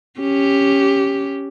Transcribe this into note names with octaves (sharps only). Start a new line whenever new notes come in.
C#4 G4